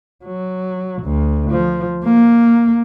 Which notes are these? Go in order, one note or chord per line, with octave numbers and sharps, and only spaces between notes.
F#3
D2
F3
A#3